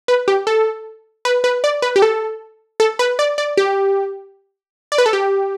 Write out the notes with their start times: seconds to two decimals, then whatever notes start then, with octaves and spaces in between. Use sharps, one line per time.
0.08 B4
0.28 G4
0.47 A4
1.25 B4
1.44 B4
1.64 D5
1.82 B4
1.96 G4
2.02 A4
2.80 A4
2.99 B4
3.19 D5
3.38 D5
3.57 G4
4.92 D5
4.98 B4
5.06 A4
5.13 G4